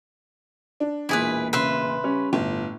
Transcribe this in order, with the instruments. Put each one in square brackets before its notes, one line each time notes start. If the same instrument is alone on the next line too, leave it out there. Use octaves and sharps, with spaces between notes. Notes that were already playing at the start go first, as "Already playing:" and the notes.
[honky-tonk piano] D4
[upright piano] E1 A#2 [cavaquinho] E4 G#4 B4
[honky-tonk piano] C#3 [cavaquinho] B4 E5 C6
[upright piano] G3 C#4
[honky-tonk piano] G1 [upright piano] A2